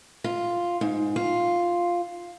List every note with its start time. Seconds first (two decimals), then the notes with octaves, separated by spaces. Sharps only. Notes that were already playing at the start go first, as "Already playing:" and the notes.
0.24 F4
0.81 G#2
1.16 F4